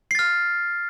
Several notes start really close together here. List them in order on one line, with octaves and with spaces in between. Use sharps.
C7 A6 F6